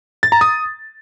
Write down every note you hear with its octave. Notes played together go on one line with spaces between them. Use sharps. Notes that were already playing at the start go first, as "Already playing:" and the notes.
A6
A#5
D#6